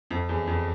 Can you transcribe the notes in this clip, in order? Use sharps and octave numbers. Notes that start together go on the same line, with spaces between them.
F2
E2
F2